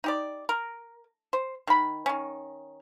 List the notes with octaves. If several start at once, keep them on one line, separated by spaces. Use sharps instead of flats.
D#4 G4 D5
A#4
C5
D#3 B5
D#3 C#4